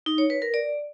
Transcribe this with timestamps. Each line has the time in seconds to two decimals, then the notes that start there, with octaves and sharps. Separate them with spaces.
0.06 D#4
0.18 C#5
0.30 B4
0.42 A#4
0.54 D5